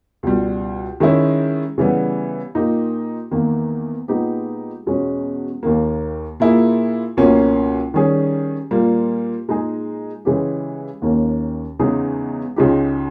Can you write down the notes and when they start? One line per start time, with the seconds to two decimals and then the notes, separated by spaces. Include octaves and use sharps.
0.23 C#2 B2 G3
1.00 D#3 G#3 C#4 E4
1.78 C#3 E3 G3 B3
2.55 A#2 A#3 D#4 G4
3.31 E2 D#3 A#3
4.08 A#2 G#3 B3 D#4 G4
4.86 E2 B2 G#3 C#4
5.63 D#2 D#3 A#3
6.40 A#2 A#3 E4 G#4
7.17 C#2 B2 A#3 C#4
7.94 D#3 G3 C#4 G#4
8.71 A#2 G3 A#3
9.48 A#2 G#3 D#4 G#4
10.25 C#3 E3 G#3 C#4 G4
11.02 D#2 D#3 A#3 C#4
11.79 E2 C#3 G#3 D#4 G#4
12.56 C#2 C#3 G#3 D#4 G4